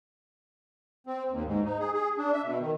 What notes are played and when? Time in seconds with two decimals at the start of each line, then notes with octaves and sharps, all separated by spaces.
1.07 C4
1.31 D#2
1.45 G#2
1.65 D#4
1.79 G#4
1.93 G#4
2.18 D4
2.33 E5
2.45 B2
2.60 D#3